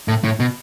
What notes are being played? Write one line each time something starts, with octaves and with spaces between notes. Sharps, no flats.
A2
A2
B2